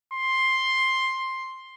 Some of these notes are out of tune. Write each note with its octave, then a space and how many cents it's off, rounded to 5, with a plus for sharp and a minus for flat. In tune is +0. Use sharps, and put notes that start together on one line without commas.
C6 +10